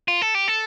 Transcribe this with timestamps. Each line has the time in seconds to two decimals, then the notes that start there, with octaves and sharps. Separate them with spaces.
0.08 F4
0.22 A4
0.35 G4
0.48 A4